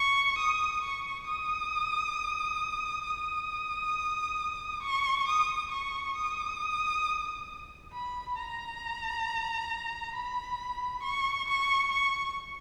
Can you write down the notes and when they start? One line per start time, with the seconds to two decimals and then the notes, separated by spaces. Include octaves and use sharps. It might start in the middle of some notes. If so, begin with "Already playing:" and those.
Already playing: C#6
0.38 D#6
0.82 C#6
1.27 D#6
3.04 D#6
4.82 C#6
5.27 D#6
5.71 C#6
6.16 D#6
7.93 B5
8.37 A#5
10.14 B5
11.03 C#6
11.48 C#6
11.91 C#6